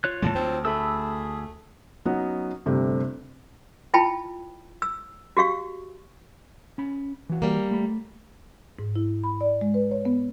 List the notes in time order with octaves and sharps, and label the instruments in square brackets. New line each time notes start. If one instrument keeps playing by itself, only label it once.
[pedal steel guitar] F4 C#5 F#6
[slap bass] A2 E3 G#3 [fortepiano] A5
[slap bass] D2 [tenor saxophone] C4
[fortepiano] A3 [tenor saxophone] G#4 [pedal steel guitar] B5 E6
[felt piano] F#3 B3 C#4 D#4 F#4
G1 C3 A3 C4 G4
[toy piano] E4 F4 G5 A5 B5
E6
F#4 G4 F5 C#6
[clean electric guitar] C#4 B5
E3 F#4
[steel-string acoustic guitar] G3 A#3
[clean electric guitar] A3 B5
[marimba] G#2
E4
B5
D5
G#3
B4
C#5
B3